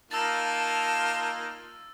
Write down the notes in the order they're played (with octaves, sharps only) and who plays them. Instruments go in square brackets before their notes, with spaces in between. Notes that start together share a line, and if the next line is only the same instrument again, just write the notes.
[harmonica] A#3 D#4 F4 [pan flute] A5 [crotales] E6 A6